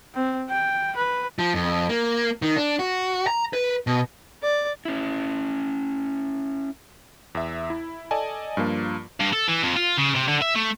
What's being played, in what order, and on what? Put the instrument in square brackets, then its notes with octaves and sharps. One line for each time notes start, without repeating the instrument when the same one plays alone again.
[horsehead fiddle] C4
G5
B4
[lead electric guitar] F3
F2
A#3
D#3
D4
F#4
A#5
B4
B2
[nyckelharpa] D5
[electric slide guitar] C#4 E4
[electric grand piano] E2 E5
E4
A4 D5 D#5 G#5 A5
G2 F3 A#3 F4
[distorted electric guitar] G2
A4
E3
F2
F4
C#3
C3
D3
E5
A3